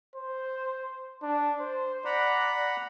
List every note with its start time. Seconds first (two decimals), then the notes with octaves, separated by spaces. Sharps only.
0.16 C5
1.23 D4
1.60 C5
2.05 D5 F#5 A#5 B5